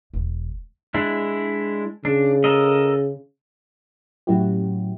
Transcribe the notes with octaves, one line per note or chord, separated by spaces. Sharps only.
E1
G#3 D4 E4
C#3 D4
A4 A#4 D#5
A2 F#3 C#4 E4 F#4 G4